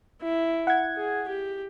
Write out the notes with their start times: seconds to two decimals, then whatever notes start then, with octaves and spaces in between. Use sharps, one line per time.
0.22 E4
0.67 F#5 G#6
0.97 G#4
1.28 G4